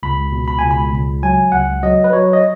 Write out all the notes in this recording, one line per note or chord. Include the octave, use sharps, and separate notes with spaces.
C#2 B5
B2
B5
C#2 G#5
B5
C#2
F#3 G#5
C#2 F#5
F#3 D#5
B4
F#3 C#5
D#5